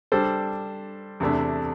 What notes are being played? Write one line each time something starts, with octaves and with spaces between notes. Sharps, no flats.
G3 D4 A4 C5
E2 C3 A3 D4